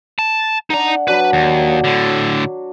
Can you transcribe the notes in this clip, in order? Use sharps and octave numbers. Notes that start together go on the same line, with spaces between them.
A5
D4 D#4 F#5 A#5
F#3 D4 F#4 B4
D#2
A2 D3